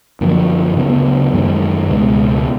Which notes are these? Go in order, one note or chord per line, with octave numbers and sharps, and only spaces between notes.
F#2 D3 F3 A#3
D2 C#3 F#3 B3
F#2 D#3 G#3
C#2 B2 G#3